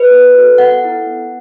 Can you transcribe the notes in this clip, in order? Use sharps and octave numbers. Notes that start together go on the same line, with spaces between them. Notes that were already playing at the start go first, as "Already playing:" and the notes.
Already playing: B4
B3
F#4 A4
B3 F#5
E4 A4
B3